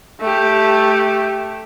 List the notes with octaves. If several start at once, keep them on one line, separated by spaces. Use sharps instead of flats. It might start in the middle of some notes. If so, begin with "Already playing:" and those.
A3 G4